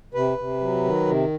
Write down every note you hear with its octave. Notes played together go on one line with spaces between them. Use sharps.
C3 B4
C3
F#3
D#3
C3